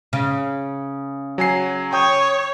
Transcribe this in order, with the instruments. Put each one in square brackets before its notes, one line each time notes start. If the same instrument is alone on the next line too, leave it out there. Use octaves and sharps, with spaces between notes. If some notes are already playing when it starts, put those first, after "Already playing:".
[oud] C#3
[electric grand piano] F#3 G#5 C7
[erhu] C#5 [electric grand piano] G5 D#6 G6